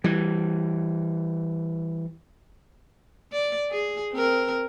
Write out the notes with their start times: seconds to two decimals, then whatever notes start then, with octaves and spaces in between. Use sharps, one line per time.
0.04 E3 G3
3.33 D5
3.72 G#4
4.13 C4 A#4